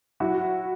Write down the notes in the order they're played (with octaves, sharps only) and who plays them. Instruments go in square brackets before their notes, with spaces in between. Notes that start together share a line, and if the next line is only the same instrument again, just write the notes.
[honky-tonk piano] F#3 E4 F#4